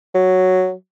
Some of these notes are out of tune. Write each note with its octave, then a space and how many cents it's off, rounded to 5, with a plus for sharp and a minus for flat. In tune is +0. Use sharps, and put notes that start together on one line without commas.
F#3 +0